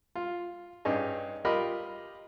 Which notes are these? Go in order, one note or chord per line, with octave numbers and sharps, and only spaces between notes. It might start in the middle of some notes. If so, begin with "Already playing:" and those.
F4
G2 C#4 D#4 G#4
F4 G4 A#4 D#5 B5